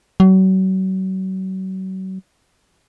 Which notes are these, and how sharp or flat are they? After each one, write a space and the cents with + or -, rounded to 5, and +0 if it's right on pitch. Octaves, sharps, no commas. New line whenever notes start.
F#3 +35